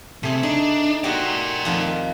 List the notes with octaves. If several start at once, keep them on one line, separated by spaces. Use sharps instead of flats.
C3 A3 G#4
D4 D#4
F#4 G4 A#4 D5
F2 D#3 F4